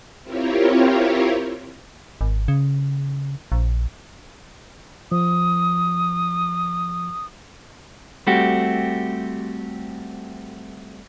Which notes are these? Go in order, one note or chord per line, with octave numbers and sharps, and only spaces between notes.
C4 E4 F4 G4 A#4 C#5
G#1
C#3
A#1
F3 D#6
G3 A3 C4 F#4 G4